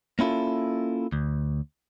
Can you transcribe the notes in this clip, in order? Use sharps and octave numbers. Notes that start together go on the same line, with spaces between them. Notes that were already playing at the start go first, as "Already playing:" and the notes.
A#3 C#4 E4 F4 A4
D2